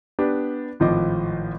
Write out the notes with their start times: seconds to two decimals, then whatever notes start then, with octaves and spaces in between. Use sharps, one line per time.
0.19 B3 D4 G4 B4
0.80 G#1 A2 F3 F4 D#5 D6